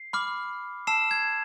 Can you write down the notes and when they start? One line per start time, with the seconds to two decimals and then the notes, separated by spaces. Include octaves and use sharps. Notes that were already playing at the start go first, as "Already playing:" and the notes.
Already playing: C7
0.13 B5 D6 F6
0.87 A5 E6 C7 E7
1.11 G#6